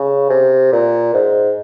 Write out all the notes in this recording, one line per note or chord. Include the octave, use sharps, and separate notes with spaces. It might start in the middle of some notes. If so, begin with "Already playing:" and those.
Already playing: C#3
C3
A#2
G#2